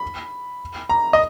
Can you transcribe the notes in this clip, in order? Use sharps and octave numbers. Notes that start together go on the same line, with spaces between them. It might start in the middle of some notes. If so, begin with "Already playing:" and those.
Already playing: B5
A#5
D#5